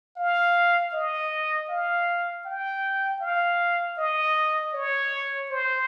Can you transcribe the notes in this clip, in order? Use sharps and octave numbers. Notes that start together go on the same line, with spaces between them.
F5
D#5
F5
G5
F5
D#5
C#5
C5